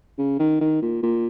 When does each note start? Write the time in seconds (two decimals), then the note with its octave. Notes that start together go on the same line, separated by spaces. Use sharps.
0.18 C#3
0.39 D#3
0.61 D#3
0.82 A#2
1.03 A#2